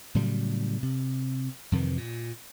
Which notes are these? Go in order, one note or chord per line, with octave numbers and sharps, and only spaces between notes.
A2 C#3 F#3 G3
C3
F2 C3 D#3 E3
A#2